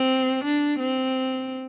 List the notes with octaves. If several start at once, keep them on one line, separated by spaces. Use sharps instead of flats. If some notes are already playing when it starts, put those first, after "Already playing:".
Already playing: C4
D4
C4